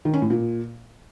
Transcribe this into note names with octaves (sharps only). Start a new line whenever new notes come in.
D#3
C#4
A2
A#2